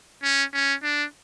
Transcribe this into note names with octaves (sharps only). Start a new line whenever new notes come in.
C#4
C#4
D4